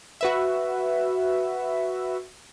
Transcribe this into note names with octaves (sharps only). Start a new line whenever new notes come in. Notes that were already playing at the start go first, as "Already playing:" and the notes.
F#4 B4 E5